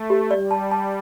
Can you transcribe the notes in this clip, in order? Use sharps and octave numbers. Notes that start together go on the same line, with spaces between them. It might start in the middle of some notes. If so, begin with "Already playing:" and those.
Already playing: A3
G4
G3 D5
A5
A5